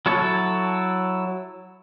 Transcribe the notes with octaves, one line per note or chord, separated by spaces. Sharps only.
F#3 E4 A4 C#5 A5